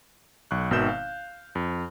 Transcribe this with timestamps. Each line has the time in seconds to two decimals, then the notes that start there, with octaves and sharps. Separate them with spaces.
0.51 B1 C#6 F#6
0.71 G#1 B2 D#3 E5 G6 E7
0.89 F5
1.55 F2